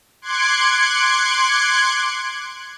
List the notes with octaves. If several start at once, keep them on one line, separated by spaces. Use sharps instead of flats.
C6 D6 F#6 G#6 C#7